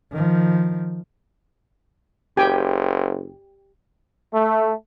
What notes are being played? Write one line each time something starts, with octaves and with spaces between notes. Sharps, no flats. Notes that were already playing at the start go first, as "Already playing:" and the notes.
D#3 F3
F#1 G4 G5 G#5
A3